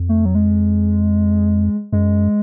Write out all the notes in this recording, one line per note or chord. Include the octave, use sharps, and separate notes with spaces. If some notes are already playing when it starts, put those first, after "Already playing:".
Already playing: F2
A3
F#3
G#3
F#2 G#3